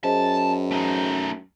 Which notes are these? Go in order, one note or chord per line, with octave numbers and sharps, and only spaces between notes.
F#2 G#4 C5 D#5 A5
A3 D#4